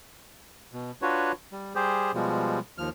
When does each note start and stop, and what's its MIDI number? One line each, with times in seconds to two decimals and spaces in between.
0.73 0.91 47
1.02 1.32 62
1.02 1.32 65
1.02 1.32 66
1.02 1.32 71
1.02 1.32 73
1.52 1.73 55
1.75 2.11 55
1.75 2.11 67
1.75 2.11 68
1.75 2.11 72
2.14 2.59 47
2.14 2.59 53
2.14 2.59 55
2.14 2.59 56
2.78 2.89 39
2.78 2.89 53
2.78 2.89 89